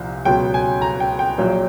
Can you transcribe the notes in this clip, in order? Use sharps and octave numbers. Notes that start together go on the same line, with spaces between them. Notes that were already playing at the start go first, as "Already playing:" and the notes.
Already playing: C2 A#2 F3
C#2 B2 F#3 G5
G#5
A#5
G5
G5
A#1 A#2 F#3